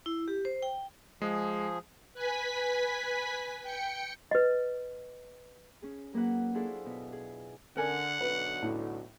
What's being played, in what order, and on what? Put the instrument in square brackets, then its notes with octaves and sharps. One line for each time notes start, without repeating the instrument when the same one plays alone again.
[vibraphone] E4
G4
C5
G5
[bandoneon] F3 G#4 [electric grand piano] G#3
[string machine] B4 G#5 B6
G5 C#7
[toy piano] B4 D#5
[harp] C#4 G#4
F#3 A#3 G#4 B4 F#5
D4 E4 F4 G#4 A4 C5
B2
G#4
[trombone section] D3 [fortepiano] A#4 G#5 [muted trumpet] F#5
[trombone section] B1 D3 F#4 [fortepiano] B4
[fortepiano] A2